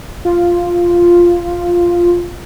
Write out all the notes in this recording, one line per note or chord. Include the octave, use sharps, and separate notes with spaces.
F4